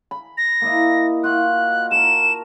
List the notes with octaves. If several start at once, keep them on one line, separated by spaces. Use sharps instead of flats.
B5
A#6
A#3 E4 D#5
F4 F#4 F#6
A#4 A5 E7